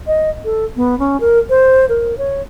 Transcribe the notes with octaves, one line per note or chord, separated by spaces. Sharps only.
D#5
A4
B3
C#4
A#4
C5
A#4
C#5